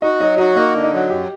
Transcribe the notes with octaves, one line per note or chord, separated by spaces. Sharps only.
D#4 F#4
F#3 D#4
D#4 F#4
A#3 D#4
D3
D#4
F#3 F#4
F#2 G4